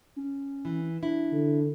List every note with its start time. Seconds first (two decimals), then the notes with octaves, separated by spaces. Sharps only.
0.16 C#4
0.65 E3
1.03 D4 E4
1.32 D3